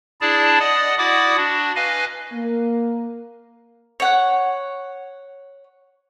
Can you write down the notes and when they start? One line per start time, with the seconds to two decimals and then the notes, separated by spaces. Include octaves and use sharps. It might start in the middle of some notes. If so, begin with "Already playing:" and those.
0.21 D4 E4 G#4 D5 A5
0.60 D5 D#5 F#5 D#6
0.98 E4 F#4 D5 F#5 D6 D#6
1.37 D4 F#4
1.76 B4 D#5 F5 G#5
2.32 A#3
4.00 C#5 F#5